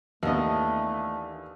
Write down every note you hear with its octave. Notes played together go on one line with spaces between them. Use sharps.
D#2 E3 A3 B3 D4 D#5